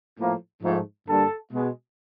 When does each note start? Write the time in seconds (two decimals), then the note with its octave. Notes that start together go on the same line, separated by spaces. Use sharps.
0.19 A2 F3 A#3
0.63 G#2 F3 A3
1.08 G2 D3 G3 A#3 A4 A5
1.53 B2 G#3